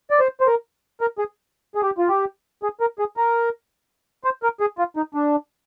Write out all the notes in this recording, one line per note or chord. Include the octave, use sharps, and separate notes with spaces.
D5
C5
C5
A#4
A#4
G#4
G#4
G4
F4
G4
G#4
A#4
G#4
A#4
C5
A#4
G#4
F4
D#4
D4